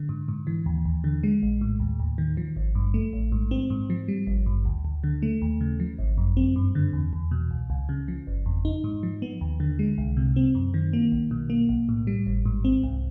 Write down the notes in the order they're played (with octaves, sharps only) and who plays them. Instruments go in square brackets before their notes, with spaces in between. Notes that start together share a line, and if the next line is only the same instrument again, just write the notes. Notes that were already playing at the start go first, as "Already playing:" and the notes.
Already playing: [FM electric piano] D3
G#2
G#2
E3
D#2
D#2
D3
G#3
A#1
A2
D#2
D#2
D#3
F3
G#1
G2
A3
A1
G#2
C4
G#2
F3
G3
G#1
G2
D2
D2
D3
A3
D#2
C#3
F3
G#1
F#2
C4
G2
D3
E2
E2
B2
C#2
C#2
C#3
F3
G1
F2
D#4
G#2
F3
B3
D#2
D3
G#3
C2
C3
C4
F#2
D#3
A#3
B1
B2
A#3
B1
A2
G3
G#1
G#2
C4
C2